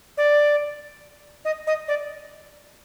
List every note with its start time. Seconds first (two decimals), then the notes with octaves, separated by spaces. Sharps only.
0.17 D5
1.45 D#5
1.67 D#5
1.88 D5